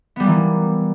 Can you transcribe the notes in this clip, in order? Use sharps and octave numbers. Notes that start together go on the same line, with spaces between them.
E3 G3 A#3 B3